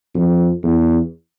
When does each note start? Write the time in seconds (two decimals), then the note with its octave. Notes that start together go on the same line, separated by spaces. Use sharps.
0.14 F2
0.63 E2